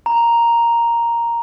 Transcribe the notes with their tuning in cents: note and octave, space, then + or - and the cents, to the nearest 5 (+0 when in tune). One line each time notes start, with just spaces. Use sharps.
A#5 +0